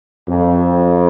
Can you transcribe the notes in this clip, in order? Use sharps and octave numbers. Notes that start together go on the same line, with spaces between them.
F2